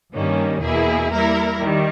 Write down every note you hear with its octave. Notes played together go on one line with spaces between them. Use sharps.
G2 D#3 G3 A#3 C#4
E2 B2 A#3 E4 G#4
G3 A#3 E4 A#4
D#3 G3